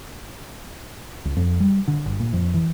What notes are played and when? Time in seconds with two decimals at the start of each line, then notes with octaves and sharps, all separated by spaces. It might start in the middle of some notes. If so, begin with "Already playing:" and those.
1.25 C#2
1.37 F2
1.60 G3
1.88 D3
2.06 G1
2.20 A#2
2.33 F2
2.54 E3